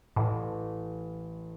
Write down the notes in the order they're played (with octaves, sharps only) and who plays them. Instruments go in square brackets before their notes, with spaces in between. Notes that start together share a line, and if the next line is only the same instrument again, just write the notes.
[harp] A1 [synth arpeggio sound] A2